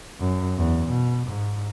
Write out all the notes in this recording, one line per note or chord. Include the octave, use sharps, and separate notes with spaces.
F#2
E2
B2
G#2